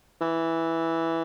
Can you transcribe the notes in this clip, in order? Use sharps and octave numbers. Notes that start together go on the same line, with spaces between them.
E3